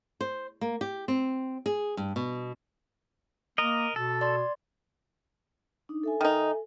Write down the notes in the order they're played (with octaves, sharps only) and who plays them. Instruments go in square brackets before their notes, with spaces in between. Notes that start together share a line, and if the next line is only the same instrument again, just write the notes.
[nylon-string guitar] C5
A#3
G4
C4
G#4
G2
B2
[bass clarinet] A#3 [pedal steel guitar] A#4 D#5
[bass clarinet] B2 [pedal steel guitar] A4
[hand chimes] D5 C6 A6
[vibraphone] D4 D#4
A4 E5 G#5
[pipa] D#3 D#4